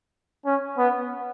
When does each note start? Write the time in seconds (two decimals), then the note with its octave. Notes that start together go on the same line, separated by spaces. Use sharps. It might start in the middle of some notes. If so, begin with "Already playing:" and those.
0.45 C#4
0.78 B3